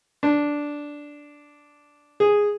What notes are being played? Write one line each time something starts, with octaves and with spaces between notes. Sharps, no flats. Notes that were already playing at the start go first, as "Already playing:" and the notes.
D4
G#4